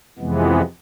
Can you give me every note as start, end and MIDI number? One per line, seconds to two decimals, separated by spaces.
0.19 0.62 41
0.19 0.62 48
0.19 0.62 52
0.19 0.62 56
0.19 0.62 59